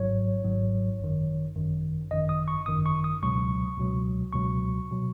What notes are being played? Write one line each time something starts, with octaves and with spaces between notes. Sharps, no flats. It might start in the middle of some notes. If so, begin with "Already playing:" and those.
Already playing: G#1 G#2 F#3 C#5
G#1 G#2 F#3
G#1 F#2 D#3
G#1 F#2 D#3
G#1 F#2 D#3 D#5
D#6
C#6
G#1 F#2 D#3 D#6
C#6
D#6
C#2 B2 F#3 C#6
C#2 B2 F#3
C#2 B2 F#3 C#6
B2 F#3